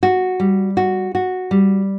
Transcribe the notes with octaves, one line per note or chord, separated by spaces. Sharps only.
F#4
G3
F#4
F#4
G3